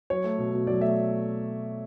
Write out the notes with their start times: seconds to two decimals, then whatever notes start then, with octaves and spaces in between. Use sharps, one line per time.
0.10 F#3 C#5
0.24 A3
0.39 B2
0.53 B2
0.67 F#3 D5
0.81 A3 E5